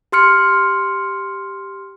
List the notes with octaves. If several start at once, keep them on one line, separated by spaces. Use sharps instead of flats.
G4 C6 F6 C#7